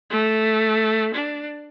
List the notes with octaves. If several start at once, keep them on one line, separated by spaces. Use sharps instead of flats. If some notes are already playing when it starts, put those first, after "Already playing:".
A3
D4